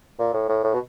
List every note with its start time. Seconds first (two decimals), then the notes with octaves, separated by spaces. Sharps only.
0.19 A#2
0.33 A2
0.48 A2
0.64 A2
0.74 B2